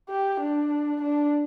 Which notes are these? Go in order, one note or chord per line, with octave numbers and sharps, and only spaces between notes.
G4
D4
D4